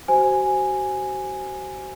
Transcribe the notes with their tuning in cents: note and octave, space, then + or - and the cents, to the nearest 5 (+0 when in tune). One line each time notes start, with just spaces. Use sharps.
F#4 +40 C5 +0 G#5 +0